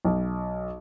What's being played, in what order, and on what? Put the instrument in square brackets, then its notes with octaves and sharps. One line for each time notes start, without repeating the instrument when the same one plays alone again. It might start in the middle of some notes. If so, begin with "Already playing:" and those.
[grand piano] B1